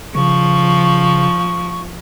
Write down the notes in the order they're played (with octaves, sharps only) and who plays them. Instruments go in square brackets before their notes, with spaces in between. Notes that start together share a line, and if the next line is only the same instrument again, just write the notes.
[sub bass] C#3 [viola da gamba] F3 [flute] C#6